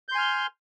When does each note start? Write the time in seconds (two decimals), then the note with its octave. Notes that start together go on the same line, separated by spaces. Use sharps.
0.09 G6
0.12 C6
0.15 G#5
0.18 F6